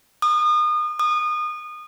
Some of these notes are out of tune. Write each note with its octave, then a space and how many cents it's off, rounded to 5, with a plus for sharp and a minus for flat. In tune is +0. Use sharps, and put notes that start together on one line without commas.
D#6 -35
D#6 -30